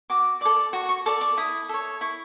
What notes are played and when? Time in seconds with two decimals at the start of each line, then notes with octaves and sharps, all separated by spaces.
0.10 F#4 D6
0.41 A4 D5 D6
0.73 F#4 C#6
0.89 C#6
1.06 A4 D5 D6
1.21 D6
1.38 E4 D#6
1.69 A4 C#5
2.01 E4 C#6